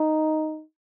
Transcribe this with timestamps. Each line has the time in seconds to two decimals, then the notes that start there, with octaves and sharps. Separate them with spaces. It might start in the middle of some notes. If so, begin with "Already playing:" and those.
Already playing: D#4